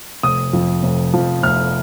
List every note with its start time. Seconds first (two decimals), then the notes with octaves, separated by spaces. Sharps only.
0.23 F1 D#6
0.53 F2 F3
0.83 F1
1.14 F2 F3
1.43 F1 F6